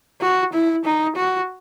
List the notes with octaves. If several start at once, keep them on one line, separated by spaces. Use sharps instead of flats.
F#4
E4
D#4
F#4